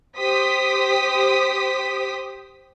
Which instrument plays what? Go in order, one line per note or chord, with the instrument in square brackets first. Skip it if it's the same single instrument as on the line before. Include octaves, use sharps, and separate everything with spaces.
[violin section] G4 C5 D#6 B6